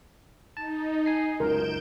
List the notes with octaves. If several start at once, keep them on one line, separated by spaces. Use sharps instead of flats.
D#4 A5
G#5 C7
C#2 F#2 A#4 G6 D7 E7